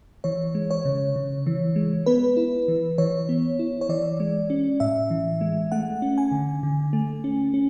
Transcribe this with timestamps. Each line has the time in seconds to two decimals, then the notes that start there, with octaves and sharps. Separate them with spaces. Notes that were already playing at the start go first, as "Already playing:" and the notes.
0.24 E3 C#5
0.55 G#3
0.71 C#5
0.85 C#3
1.16 C#3
1.47 E3
1.76 G#3
2.06 B3 B4
2.37 E4
2.68 E3
2.98 E3 C#5
3.29 B3
3.59 E4
3.81 C#5
3.89 E3 D5
4.20 G#3
4.50 C#4
4.80 A2 E5
5.11 E3
5.41 G#3
5.72 A3 F#5
6.02 C#4
6.18 G#5
6.32 D3
6.63 D3
6.93 A3
7.24 C#4
7.54 C#4